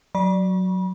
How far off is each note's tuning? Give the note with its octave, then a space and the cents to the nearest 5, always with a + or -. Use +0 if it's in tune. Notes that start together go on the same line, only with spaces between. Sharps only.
F#3 +0 D5 +0 B5 -40